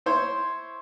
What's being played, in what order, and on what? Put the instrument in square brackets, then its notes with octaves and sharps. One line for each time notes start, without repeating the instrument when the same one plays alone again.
[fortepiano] E4 C5 C#5